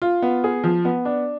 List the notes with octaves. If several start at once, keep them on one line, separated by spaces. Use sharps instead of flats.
F4
B3
G#4
F3
B3
D4